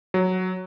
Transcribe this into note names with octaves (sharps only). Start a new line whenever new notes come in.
F#3